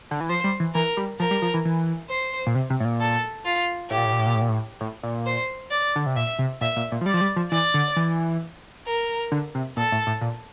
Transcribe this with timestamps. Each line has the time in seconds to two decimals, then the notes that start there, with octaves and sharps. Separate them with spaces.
0.11 D3
0.21 E3
0.29 F3 C5
0.44 G3
0.60 E3
0.74 E3 A#4
0.97 G3
1.20 F3 A#4
1.31 G3
1.42 F3
1.54 E3
1.65 E3
2.09 C5
2.47 A#2
2.55 C3
2.70 C3
2.80 A2
2.85 A#2
3.00 A4
3.45 F4
3.90 A2 G4
3.98 A#2
4.05 A2
4.12 A#2
4.19 A2
4.26 A#2
4.34 A2
4.41 A#2
4.49 A2
4.81 A2
5.03 A#2
5.26 C5
5.71 D5
5.96 D3
6.06 C3
6.16 A#2 E5
6.39 C3
6.61 A#2 E5
6.76 A#2
6.92 A#2
7.01 F3
7.06 G3 D5
7.14 F3
7.21 G3
7.36 F3
7.51 E3 D5
7.74 D3
7.96 E3
8.87 A#4
9.32 D3
9.55 C3
9.77 A#2 A4
9.92 A2
10.07 A2
10.21 A#2